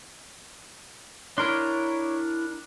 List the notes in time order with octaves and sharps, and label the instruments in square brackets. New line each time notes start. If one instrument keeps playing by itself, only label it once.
[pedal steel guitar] D4 A#4 [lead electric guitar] E4 C6 [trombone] C#5